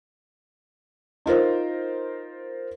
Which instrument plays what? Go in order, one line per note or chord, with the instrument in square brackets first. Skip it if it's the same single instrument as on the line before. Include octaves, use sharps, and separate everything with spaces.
[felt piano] D#4 F4 A#4 C5